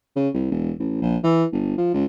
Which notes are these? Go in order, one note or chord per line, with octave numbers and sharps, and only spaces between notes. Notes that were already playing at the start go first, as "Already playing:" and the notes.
C#3
C2
E1
A1
A#1
E3
G1
F3
C#2